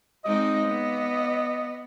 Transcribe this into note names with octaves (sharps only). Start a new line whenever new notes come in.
G#3 C4 D#4 D#5
B3